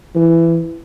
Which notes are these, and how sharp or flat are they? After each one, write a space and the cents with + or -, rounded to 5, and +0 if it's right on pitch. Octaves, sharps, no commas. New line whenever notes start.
E3 +15